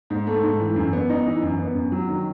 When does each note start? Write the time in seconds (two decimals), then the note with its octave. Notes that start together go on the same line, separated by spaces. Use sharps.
0.10 G#2
0.27 A3
0.43 G#2
0.60 E3
0.76 F#2
0.93 B3
1.10 D#4
1.26 E3
1.42 F#2
1.59 B3
1.75 F#2
1.92 F#3
2.09 D#3